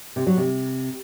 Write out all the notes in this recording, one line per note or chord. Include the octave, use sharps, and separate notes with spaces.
C3
F#3
C3